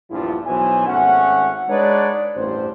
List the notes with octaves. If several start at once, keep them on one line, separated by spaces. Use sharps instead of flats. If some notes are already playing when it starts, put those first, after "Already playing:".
A#1 E2 G2 F3 E4 F4
B1 B2 E3 C5 G#5
G#1 A3 C#4 F#5
G#3 D4 D#4 B4 C#5 D5
A1 E2 G2 C5